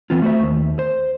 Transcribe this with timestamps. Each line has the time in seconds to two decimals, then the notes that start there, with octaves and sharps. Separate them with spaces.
0.10 E3 B3 C4 F4
0.22 A3 F#4 C5 E5
0.43 D#2
0.79 C5